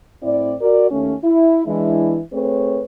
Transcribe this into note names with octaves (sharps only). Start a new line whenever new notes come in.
A2 C4 E4 D5
F#4 A#4 D5
D#2 A3 C#4
E4
E3 G#3 D4 E4
A3 C4 G#4 B4 C#5